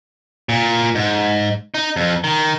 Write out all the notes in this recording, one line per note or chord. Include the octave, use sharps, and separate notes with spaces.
A#2
G#2
D#4
F2
D#3